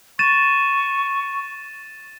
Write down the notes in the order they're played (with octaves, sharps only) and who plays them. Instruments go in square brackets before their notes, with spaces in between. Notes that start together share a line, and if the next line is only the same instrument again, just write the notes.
[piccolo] C#6 [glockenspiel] A6 D#7 E7